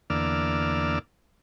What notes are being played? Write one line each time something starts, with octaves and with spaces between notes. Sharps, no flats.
E2 D3 A#3 D5 E6 F6